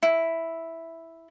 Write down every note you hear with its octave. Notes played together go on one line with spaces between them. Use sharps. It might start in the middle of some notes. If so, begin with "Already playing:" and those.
E4